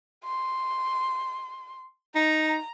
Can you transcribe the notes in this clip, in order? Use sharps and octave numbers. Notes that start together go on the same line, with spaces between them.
C6
D#4 A#5